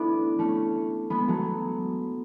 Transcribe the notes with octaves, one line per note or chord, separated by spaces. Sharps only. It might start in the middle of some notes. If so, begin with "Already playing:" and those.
Already playing: A3 B3 D4 E4
A3 C#4
G#3 B3
F#3 A3